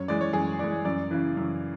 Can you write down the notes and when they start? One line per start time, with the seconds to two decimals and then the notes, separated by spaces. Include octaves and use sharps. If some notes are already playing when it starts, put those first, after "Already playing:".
Already playing: F#2 C#5
0.08 E3 G#3 D5
0.21 C#5
0.33 F#2 G#4
0.59 E3 G#3 D5
0.85 F#2 D5
1.11 C#3 E3
1.37 F#2